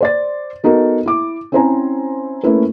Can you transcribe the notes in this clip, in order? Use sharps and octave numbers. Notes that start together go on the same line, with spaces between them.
C5 D5 A6
B3 D#4 F#4 A4 A#4
E4 D6
C4 C#4 E4 C5 G#5 A#5
A3 A#3 C#4 E4 A#4 B4